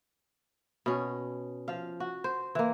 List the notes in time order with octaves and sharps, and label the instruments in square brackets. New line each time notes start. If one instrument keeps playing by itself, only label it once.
[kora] B2 C#4
F3 F5
F#4
C5
E3 A#3